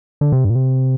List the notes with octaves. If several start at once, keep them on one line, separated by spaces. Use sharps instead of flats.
D3
C3
G2
A#2
C3